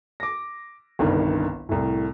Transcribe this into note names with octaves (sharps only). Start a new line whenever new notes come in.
D6 A#6
G1 C2 G2 D#3
C2 A2